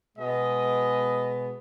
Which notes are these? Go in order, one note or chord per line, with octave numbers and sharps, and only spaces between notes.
B2 G#3 B3 D#5